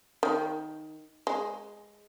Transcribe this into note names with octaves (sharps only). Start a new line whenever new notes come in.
D#3
G#3